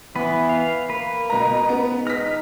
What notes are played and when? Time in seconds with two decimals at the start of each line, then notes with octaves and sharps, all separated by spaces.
0.16 E3 B3 B4
0.49 F5
0.90 A#3 B4
1.30 B2 A#5
1.69 G#2 B3
2.07 D#4 F6 A#6 B6